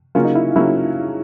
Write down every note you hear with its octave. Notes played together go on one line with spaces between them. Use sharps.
C#3 F#3 A#3 C#4 F4
D#4
E4
C#3 F#3 A#3 C#4 E4